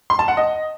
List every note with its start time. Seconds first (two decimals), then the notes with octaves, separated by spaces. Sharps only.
0.10 C6
0.19 A5
0.28 F#5
0.37 D#5